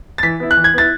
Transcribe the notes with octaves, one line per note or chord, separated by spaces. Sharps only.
A6
E3 B6
B3 E4
F#6
E3
G#6
B3 E4 A6